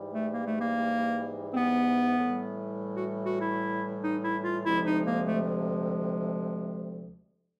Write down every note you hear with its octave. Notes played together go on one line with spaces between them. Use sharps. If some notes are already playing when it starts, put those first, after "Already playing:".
Already playing: G#2 E3 G3
A3
A#3
A3
A#3
C4
B3
A2 E3 G3
F#4
F#4
E4
D#4
E4
F4
D2 C3 F3 G#3 E4
D#4
A#3
A3